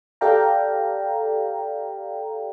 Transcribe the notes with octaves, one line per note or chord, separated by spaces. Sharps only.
G4 A4 D5 F5 G5 A#5